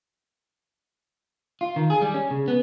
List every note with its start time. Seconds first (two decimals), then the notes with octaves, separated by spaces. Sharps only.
1.61 F4
1.76 D#3
1.90 G#4
2.02 G3
2.14 C#4
2.31 C#3
2.48 B3